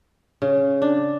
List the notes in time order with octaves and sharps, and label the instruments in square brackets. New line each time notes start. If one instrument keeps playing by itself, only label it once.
[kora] C#3
D4